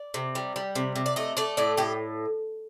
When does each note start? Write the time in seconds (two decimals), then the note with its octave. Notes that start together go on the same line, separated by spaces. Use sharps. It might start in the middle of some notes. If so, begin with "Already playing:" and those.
Already playing: D5
0.14 C3
0.35 G3
0.56 G3
0.75 C3
0.96 C3
1.06 D5
1.16 A3 D#5
1.37 A3 D5
1.57 A2 D5
1.77 A2 G4